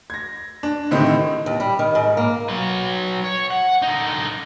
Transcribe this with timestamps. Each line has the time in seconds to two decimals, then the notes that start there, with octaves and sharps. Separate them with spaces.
0.10 G#6 A#6
0.63 D4
0.91 A2 D3 D#3 C4 D#4 G4
1.46 D#2
1.60 G3
1.79 D#3
1.95 G#2
2.17 A#3
2.49 F#3 B4
3.24 C#5
3.51 F#5
3.82 D3 D#4